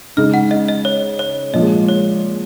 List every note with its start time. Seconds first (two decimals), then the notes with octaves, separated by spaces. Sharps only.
0.17 C#3 G#3 D#4 F6
0.34 F#5
0.51 D#5
0.68 D#5
0.85 C#5
1.19 C#5
1.53 A#2 F3 G#3 D#5
1.89 C#5